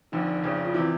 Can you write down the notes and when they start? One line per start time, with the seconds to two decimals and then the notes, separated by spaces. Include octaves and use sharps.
0.12 F1 F2 D3 D#4
0.44 F1 F2 C#3
0.65 F4
0.74 C3 E3 E4